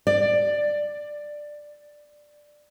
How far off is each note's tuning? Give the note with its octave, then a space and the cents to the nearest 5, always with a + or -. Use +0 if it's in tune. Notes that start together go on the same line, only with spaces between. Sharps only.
D5 +10